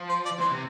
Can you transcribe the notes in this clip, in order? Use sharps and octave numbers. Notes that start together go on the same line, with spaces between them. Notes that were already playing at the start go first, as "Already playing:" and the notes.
Already playing: F3
C5
D5
E3 C5
C3